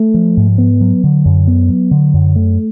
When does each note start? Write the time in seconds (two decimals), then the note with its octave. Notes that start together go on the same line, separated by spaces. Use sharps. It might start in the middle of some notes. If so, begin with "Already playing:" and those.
Already playing: A3
0.14 F3
0.37 G#2
0.58 B3
0.81 F#3
1.04 D3
1.25 F#2
1.47 B3
1.69 F#3
1.91 D3
2.14 F#2
2.36 A3